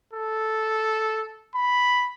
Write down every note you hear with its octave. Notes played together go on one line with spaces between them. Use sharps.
A4
B5